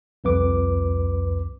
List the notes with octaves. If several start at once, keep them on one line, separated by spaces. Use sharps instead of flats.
C2 F2 B4 D6